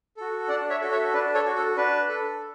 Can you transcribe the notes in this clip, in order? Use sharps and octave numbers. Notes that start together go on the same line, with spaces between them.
F#4 A4
D4 D5 F#5
C#5 E5
F#4 A4
C#5 E5
D4 B4
A4 C#5
F#4 A4
A4
D4 B4
A4